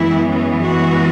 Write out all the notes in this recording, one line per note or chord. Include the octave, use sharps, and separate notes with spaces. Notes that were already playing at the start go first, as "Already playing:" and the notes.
Already playing: F#2 E3 G#3 B3 E4
C#4
F#4